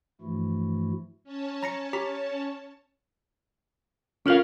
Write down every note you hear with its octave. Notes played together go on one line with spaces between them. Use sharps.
G2 E3 F3 A3 E4 F#4
C#4 C#5 A5
A#5 A#6 C#7
G4 A#5 B6
C#4 F4 A4 A#4 F5